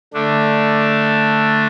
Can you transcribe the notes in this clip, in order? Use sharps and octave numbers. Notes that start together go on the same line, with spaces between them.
D3 A3 D4